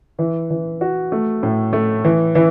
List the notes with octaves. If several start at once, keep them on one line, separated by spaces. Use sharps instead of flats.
E3
E3
F#4
A3
A2
A3
E3
E3